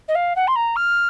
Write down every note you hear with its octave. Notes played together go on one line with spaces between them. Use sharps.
D#5
F5
F#5
C6
A#5
F6